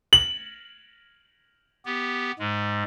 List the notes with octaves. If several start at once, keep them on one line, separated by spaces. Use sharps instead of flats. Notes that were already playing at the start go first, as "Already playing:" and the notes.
F#7
B3 G4
G#2 G#3